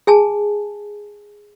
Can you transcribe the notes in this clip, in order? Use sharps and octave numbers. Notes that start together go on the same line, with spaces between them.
G#4 G#5 A5